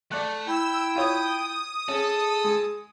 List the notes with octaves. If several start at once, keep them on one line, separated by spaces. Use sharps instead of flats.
A3 D5 F#6
E4 G5 E6
F4 C#5 D#6
C#4 G#4 A4
G#3